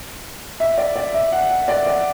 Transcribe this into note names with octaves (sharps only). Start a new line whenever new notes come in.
E5
D5
D5
E5
F#5
F#5
D5
D5